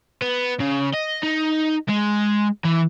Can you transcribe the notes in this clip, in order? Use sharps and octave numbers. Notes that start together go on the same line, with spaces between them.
B3
C#3
D#5
D#4
G#3
E3